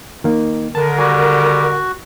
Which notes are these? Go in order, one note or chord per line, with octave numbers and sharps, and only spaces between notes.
D#3 A#3
D3 D#3 A#4 A5
G3 F#4 G#5